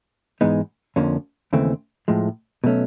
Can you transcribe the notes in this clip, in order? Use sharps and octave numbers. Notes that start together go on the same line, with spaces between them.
G#2 E3 G#3 B3 D#4
F2 D3 F3 A#3 C#4
D#2 C#3 E3 A3 C4
A2 F3 G#3
B2 F#3 A3 C#4